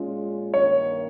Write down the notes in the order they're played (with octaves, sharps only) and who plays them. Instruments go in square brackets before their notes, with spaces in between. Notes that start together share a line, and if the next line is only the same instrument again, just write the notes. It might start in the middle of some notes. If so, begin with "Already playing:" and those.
Already playing: [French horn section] A#2 G#3 C#4 F4
[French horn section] G2 D#3 A#3 [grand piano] C#5